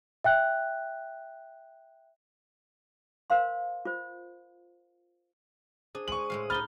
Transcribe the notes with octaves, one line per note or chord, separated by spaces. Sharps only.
E5 G5 F#6
A#4 C5 F5 C6
F4 C5
D4 G#4 C5 D#6
G#3 C#6 F#7
A2 G#3 F5
D4 D#4 B5 F6 A6 G7